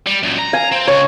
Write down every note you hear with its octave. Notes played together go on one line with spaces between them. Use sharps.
G3
F#2 A#2
A#5
F5 G#5
C4
C#2 C#5